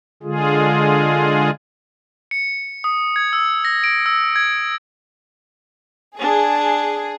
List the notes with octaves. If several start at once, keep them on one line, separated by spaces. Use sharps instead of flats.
D3 G#3 F4 G#4
C#7
D#6
G#6
E6
A#6
D7
E6
G#6
D4 G#4